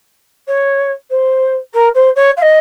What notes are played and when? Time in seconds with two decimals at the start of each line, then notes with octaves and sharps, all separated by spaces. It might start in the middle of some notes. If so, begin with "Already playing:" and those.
0.47 C#5
1.10 C5
1.74 A#4
1.94 C5
2.16 C#5
2.37 F5
2.41 D#5